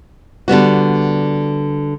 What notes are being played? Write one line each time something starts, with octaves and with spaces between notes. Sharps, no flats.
D3 G3 B3 F#4